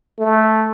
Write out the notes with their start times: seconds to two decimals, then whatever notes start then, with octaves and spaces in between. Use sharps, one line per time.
0.19 A3